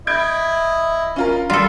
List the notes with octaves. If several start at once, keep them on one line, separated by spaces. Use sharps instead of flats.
E4 D#5 G6 G#6 D7
C#4 F4 A#4
G3 F4 A4